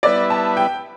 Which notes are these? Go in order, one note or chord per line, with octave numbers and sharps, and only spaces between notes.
G3 B3 E4 B4 D5 E5
A5
G5